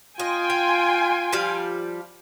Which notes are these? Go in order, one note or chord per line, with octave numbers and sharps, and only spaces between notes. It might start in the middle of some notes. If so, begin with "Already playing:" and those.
F4 D#5 G5 G#5 C6
F5
F3 G3 F5